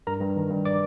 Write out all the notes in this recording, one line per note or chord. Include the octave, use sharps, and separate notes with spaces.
G2 A#4 A#5
G2
D#3
G2
D5 D6